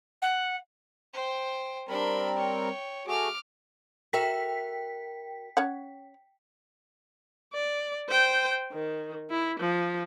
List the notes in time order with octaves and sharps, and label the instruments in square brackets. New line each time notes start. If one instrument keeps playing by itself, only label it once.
[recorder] F#5
[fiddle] C5 G5
[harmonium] G3 C4 A#4 [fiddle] D4 B5
[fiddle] C#5 G5
[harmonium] A3 F#4 G#4 [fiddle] D6 F6
[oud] F#4 A#4 E5 [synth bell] G5 B6
[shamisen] C#4 C#5 F#5
[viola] D5
C5 G5
D#3
E4
F3